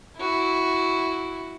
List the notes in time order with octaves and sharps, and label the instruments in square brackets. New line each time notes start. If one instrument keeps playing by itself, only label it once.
[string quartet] E4 F#4